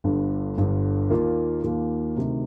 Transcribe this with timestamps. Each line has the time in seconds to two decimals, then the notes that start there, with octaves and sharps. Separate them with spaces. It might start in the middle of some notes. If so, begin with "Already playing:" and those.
0.04 G1 G2 D3
0.57 G1 G2 D3
1.10 D#2 D#3 A#3 F4
1.63 D#2 D#3 A#3 F4
2.16 D2 C3 D#3